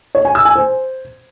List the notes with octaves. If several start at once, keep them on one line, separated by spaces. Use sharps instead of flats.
C#5
G#5
E6
G#5
C5